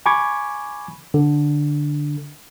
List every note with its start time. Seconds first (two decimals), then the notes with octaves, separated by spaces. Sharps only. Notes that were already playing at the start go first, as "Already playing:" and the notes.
0.06 G#5 B5 C#6 D6 G#6
1.14 D3